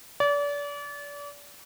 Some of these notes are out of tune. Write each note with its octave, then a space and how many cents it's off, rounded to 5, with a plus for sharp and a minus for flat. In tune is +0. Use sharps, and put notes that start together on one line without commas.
D5 -35